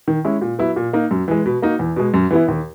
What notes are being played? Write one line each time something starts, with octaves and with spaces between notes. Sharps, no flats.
D#3
G#3 C#4 E4
A#2
F#3 B3 E4
A#2
A#3 D#4
F#2
E3 G#3
B2
A#3 D#4 F#4
E2
B2 G#3
F#2
E3 B3 E4
D#2